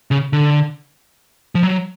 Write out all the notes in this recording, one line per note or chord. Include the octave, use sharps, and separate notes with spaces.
C#3
D3
F3
F#3